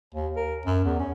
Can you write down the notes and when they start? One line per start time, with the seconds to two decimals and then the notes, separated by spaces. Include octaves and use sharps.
0.14 D#2
0.36 A#4
0.65 F#2
0.85 E2
0.99 C#4